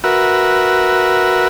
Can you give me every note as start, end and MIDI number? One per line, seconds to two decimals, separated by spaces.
0.04 1.48 66
0.04 1.48 70
0.04 1.48 71
0.04 1.48 76